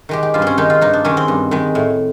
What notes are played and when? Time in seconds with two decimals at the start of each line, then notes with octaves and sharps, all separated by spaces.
0.09 D#3 G#3 G4
0.23 G4
0.34 G2 F4
0.42 C4 C#4
0.58 D#3 G#3 D#4
0.70 F4
0.81 G2 D#4
0.93 D4
1.05 D#3 G#3 C#4
1.17 C4
1.28 G2
1.51 D#3 G#3
1.75 A2